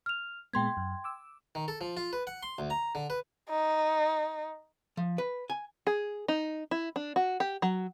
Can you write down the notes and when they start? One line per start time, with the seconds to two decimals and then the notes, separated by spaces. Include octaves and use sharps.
0.06 F6 F7
0.53 A#2 G#3 B3 G5 C6 G#6
0.77 F#2
1.04 D6 E6
1.55 D#3
1.68 A4
1.81 F3
1.97 F4
2.13 B4
2.27 F#5
2.43 C6
2.58 D2
2.70 A#5
2.95 D3
3.10 B4
3.50 D#4
4.97 F3
5.18 B4
5.50 G#5
5.87 G#4
6.28 D#4
6.71 E4
6.96 D4
7.16 F#4
7.40 G4
7.62 F#3